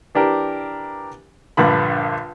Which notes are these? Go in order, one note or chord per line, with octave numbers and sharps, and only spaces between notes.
E3 D4 G4 A#4
A#1 G2 D3 B5